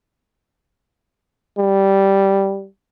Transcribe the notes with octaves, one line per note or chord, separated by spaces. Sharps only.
G3